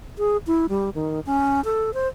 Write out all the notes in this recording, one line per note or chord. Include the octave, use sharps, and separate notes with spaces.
G#4
E4
G3
D#3
C#4
A4
C5